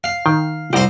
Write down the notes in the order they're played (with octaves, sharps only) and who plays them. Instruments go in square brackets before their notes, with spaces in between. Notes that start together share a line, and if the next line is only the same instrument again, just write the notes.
[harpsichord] F5
[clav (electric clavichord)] D#3 G5
[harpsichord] C2 C5 [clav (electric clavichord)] G5 A#5